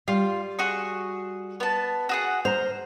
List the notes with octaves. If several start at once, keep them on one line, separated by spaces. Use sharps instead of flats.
G3 F4
F#4 G#4 C#6
B3 A5
F#4 G#4 F#5
C5 A#5 F6